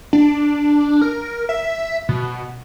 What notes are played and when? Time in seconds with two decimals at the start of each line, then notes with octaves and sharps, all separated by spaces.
0.13 D4
1.02 A#4
1.49 E5
2.09 B2